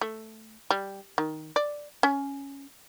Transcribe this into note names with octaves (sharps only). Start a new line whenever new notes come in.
A3
G3
D#3
D5
C#4